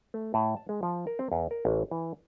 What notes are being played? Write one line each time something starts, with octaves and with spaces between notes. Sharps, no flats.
A3
A2
A5
G#3
F3
A#4
C4
E2
A#4
A1
E3